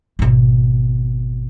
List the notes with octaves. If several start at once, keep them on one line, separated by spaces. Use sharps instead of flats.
G#1 B2